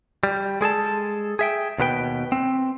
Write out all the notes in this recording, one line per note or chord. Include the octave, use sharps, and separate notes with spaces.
G3
G#3 G#4 A4 A5
G#4 E5 G5
D#2 B2 B4 G5
C4